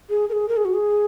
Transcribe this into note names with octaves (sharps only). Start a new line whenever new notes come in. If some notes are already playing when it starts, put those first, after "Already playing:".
G#4
A#4
G#4
A#4
G#4
F#4
G#4